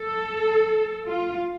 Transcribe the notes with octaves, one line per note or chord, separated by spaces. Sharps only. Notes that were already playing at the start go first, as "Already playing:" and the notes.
Already playing: A4
F4